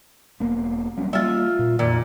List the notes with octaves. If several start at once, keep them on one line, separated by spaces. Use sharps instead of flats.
E1 A#3 B3
F#3 G3 C#4
G3 A#3 F4 E5
A#2
F2 A#2 D#3